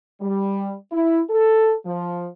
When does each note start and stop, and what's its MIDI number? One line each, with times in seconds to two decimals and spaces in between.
0.21 0.75 55
0.92 1.20 64
1.30 1.74 69
1.86 2.28 53